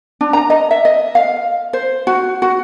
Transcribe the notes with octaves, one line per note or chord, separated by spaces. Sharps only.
D4
A#5
D#5
E5
D#5
F5
C5
F#4
F#4